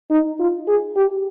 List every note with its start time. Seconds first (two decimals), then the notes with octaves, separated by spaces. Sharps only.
0.10 D#4
0.39 F4
0.67 G#4
0.96 G4